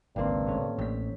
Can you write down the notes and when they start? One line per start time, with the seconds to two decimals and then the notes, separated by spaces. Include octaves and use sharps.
0.16 G#1 C#2 G2 D#3 A#3 C4
0.47 A2 C#4
0.79 A1 G4 B6